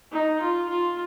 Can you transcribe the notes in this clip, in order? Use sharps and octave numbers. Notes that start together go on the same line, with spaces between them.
D#4
F4
F4